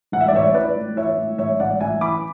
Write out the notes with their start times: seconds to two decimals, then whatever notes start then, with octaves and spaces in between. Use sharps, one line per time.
0.12 A1 F#5
0.21 E5
0.28 D5
0.33 A1 C#5 E5
0.54 E3 B4 D5
0.76 A2
0.96 E3 C#5 E5
1.18 A2
1.38 A1 C#5 E5
1.60 A1 D5 F#5
1.80 A1 E5 G#5
2.01 E3 B5 D6